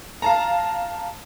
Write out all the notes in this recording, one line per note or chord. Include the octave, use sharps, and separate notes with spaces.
F5 A5 A#5